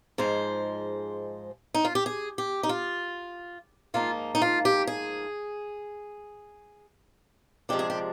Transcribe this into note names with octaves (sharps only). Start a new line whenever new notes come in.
G#2 F3 G#3 C5
D#4
F4
G4
G#4
G4
D#4
F4
G#2 F3 A#3 D#4 F4
D#4
F4
G4
G#4
C3 F3 G#3 D4 G4
G#4
G4